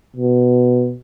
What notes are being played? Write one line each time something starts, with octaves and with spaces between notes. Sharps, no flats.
B2